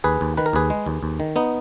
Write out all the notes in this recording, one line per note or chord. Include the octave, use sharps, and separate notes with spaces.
D#2 G#4 B4
D#2
D#3 B4
A#4
D#2 G#4 B4
G#3
D#2
D#2
D#3
B3 D#4